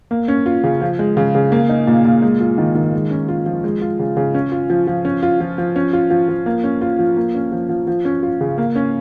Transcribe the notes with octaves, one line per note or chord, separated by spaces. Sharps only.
A#3
C#4
F4
C#3
F3
G#3
C#3
C#3
A#3
D#4
A#2
A#2
G#3
F4
D#3
D#3
G#3
C#4
F4
F3
G#3
F4
C#3
C#3
C#4
F4
F3
F3
C#4
F4
F3
F3
C#4
F4
F3
F3
A#3
C#4
F4
F3
A#3
C#4
F3
F3
F3
C#4
F4
C#3
A#3
C#4